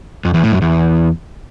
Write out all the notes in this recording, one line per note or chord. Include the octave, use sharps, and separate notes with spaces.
F2
E2
A2
F#2
E2